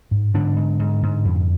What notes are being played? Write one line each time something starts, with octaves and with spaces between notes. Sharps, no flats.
G#2
G#2 D3 D4
G#2
G#2
G#2
F2